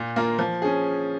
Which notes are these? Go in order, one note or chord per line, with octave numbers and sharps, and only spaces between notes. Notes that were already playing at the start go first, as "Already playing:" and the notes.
Already playing: A#2
A#3 F4 A#4
F3
C#4 G#4